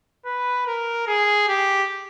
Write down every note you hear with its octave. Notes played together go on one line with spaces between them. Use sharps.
B4
A#4
G#4
G4